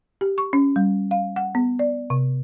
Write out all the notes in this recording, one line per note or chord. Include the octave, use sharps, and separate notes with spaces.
G4
C#6
C#4
G3
F5
F#5
B3
D5
C3